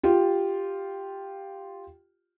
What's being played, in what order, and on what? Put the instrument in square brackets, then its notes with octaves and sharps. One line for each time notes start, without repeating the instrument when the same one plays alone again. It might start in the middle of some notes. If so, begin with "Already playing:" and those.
[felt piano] F4 G4